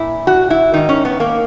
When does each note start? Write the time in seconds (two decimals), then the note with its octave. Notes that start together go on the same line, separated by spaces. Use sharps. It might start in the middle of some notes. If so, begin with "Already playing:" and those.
Already playing: A#2 E4
0.27 F#4
0.50 E4
0.74 G#2 D#3 D#4
0.89 C#4
1.05 B3
1.20 A#3